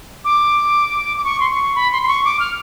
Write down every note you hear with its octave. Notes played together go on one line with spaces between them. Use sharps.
D6
D6
C#6
C6
C#6
B5
C6
C6
C#6
D6
F6